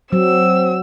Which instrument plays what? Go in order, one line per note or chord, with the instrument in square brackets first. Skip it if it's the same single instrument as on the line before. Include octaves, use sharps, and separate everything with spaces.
[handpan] F#3 [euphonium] C4 [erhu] E6